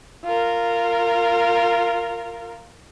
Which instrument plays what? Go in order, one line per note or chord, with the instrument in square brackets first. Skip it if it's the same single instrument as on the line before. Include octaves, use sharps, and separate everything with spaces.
[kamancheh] F4 A#4